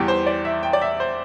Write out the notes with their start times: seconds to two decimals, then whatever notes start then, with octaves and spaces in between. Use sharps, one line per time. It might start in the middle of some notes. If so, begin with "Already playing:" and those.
Already playing: E2 E3 G3 G4
0.08 C5
0.26 D5
0.45 E5
0.63 G5
0.73 D5
0.82 E5
1.00 C5